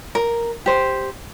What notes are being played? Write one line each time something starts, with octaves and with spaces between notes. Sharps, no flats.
A#4
G4 C5